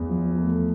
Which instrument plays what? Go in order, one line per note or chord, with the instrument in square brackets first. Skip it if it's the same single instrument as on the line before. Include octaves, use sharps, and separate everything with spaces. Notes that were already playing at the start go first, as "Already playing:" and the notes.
Already playing: [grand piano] E2
F3
A3